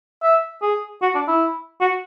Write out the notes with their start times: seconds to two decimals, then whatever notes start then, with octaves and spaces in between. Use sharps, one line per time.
0.23 E5
0.62 G#4
1.02 F#4
1.15 D4
1.28 E4
1.81 F#4